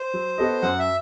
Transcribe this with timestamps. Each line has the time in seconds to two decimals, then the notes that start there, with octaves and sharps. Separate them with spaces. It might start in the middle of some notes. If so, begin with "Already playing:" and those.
Already playing: C5
0.14 F#3
0.38 B3 F#4 A4 D#5
0.62 F#2 F#5
0.79 E5